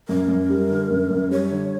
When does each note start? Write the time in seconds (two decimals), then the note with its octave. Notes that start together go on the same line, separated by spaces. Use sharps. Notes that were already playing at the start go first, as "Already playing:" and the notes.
0.08 F#2 A#4
0.28 F#2
0.50 G3
0.70 D3
0.90 F#2
1.10 F#2
1.30 G3 C#5
1.51 D3